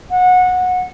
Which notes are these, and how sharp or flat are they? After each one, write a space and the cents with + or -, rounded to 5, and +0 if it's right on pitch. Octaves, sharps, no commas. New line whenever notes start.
F#5 -20